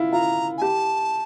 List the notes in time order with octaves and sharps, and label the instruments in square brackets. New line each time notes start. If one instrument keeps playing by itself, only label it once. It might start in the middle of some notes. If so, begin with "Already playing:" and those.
Already playing: [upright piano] E4 F4
[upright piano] F4 [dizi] A#5
[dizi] G#5
[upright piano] G4 [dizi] A5